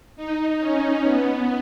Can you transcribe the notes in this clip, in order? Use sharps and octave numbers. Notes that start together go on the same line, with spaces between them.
D#4
C#4
B3